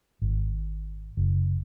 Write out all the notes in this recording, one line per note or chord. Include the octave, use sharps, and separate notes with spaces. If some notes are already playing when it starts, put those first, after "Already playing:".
G#1
F#1